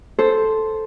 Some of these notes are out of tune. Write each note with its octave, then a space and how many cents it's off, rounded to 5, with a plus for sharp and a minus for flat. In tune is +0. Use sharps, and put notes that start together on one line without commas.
A4 -5 C5 +0